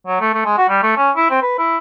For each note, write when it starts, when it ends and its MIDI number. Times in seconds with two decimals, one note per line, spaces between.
0.06 0.20 54
0.21 0.31 57
0.34 0.42 57
0.45 0.54 56
0.58 0.66 66
0.69 0.82 55
0.83 0.92 57
0.97 1.11 61
1.16 1.26 64
1.30 1.40 60
1.42 1.58 71
1.58 1.78 64